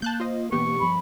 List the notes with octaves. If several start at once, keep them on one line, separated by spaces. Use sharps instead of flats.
A#3 A5 F#6 G6
F4 C5 D#5
B2 E3 A#3 B3 G4 C#6
G2 F3 B5